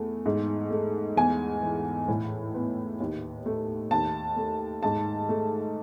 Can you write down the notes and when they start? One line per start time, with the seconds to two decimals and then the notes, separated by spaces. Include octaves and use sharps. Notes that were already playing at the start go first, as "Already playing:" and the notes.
Already playing: E2 A3
0.26 G#2
0.71 A3
1.17 E2 G#5
1.62 E3
2.08 A2
2.54 B3
3.00 D#2
3.46 A3
3.91 D#2 A5
4.37 A3
4.83 G#2 A5
5.29 A3